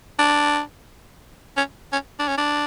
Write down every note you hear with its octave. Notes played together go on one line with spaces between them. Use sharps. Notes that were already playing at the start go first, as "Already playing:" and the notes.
D4
C#4
C#4
D4
C#4
D4